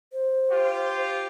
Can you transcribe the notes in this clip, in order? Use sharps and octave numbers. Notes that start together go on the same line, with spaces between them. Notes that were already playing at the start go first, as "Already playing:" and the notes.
C5
F4 G4